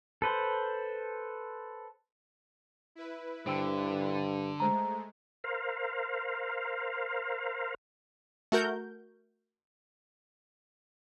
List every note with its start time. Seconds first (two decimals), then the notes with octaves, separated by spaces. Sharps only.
0.22 A4 B4 C5
2.95 E4 B4
3.47 G2 D3 C5 G5 E6
4.60 G#3 A3 C5 A#5
5.44 A#4 C5 F5
8.52 A3 F#4 A#4 G6